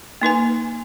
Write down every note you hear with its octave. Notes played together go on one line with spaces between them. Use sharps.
A#3 D#4 B4 G#5